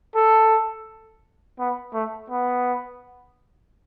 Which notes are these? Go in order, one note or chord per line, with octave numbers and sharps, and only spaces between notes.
A4
B3
A3
B3